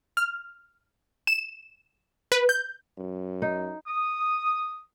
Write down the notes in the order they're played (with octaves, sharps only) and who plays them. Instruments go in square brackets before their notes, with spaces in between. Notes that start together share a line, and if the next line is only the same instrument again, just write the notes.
[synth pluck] F6
E7
B4
G6
[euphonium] F#2
[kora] D#4
[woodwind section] D#6